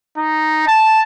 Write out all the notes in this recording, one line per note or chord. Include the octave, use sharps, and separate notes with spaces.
D#4
A5